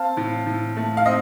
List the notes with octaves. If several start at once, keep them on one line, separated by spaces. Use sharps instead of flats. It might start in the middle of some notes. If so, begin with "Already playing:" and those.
Already playing: C4 F5 A5
A2
A2
A3
F5
C4 D#5